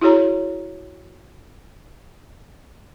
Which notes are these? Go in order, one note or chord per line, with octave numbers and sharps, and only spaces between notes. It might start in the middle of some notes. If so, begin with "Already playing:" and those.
E4 F#4 G#4 C#5 A#5